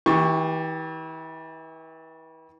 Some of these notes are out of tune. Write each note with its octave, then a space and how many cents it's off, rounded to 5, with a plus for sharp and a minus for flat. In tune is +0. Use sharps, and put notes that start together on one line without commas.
E3 -35 G4 -5 C#6 +0